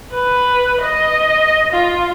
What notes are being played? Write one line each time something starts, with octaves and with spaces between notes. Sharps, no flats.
B4
D#5
F4